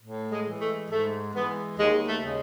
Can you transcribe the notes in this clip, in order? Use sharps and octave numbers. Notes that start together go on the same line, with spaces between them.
A2
G#3
E3 G#3
A3
G#2 A3
E3 G#3 B3
D#2 G#3
A3
C#3 G#3